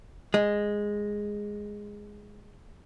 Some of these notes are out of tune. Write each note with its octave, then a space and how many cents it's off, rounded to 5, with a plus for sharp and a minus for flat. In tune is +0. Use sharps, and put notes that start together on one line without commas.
G#3 -5